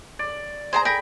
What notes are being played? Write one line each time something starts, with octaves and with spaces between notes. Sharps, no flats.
D5
G#4 C5 A5 A#5
A#4 G5 B5